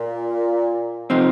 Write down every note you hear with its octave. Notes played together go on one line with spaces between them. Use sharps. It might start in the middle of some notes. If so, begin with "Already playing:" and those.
Already playing: A#2
C3 F3 C4 D#4